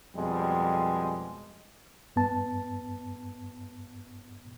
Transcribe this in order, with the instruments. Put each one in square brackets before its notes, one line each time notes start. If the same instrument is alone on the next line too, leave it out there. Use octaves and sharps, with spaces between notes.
[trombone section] F2 B2 G3 G#3
[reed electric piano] G2 B3 A5